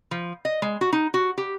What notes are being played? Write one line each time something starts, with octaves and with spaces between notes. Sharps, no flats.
F3
D#5
G#3
F#4
D#4
F#4
G4